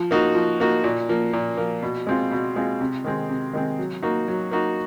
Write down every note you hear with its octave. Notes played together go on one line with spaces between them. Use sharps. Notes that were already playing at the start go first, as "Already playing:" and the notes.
Already playing: F3
A#3 D#4 F#4
F3
A#3 D#4 F#4
A#2
F3 A#3
A#2
F3 A#3
B2
G#3 C4 F4
B2
G#3 C4 F4
C3
D#3 G#3 C4
C3
D#3 G#3 C4
F#3
A#3 D#4 F#4
F#3
A#3 D#4 F#4